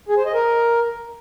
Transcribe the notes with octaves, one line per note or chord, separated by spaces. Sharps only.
G#4
C5
D#5
A#4